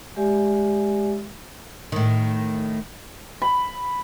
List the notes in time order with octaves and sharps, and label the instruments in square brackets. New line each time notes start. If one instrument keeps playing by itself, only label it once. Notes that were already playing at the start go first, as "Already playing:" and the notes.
[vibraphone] G#3 G4 D5 E5 G#5
[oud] A2 D#3
[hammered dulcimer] B5